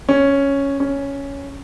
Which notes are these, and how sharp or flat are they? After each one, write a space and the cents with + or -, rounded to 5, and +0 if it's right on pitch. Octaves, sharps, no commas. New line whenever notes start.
C#4 +0
C#4 +5